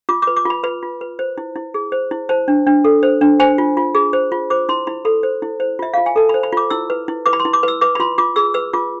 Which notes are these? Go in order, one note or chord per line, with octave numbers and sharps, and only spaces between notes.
F4 D6
D6
B4
D6
F4 B5
B4 B5
F4
B4
C5
E4
E4
G#4
C5
E4
C5 A5
D4
D4
A4
C5
D4
C5 G#5
F4
F4
G#4
C5
F4
C5 D6
E4 C6
E4 B5
A4 B5
C5
E4
C5
F4 E5
F4 F5
G#5
A4 A5
B5
C5
B5
F4 D6
E4 E6
B4
E4
B4 D6
B5
C6
E4
D6
B4 E6
B4 D6
B5
F4 C6
F4 D6
G#4 E6
B4 E6
F4 D6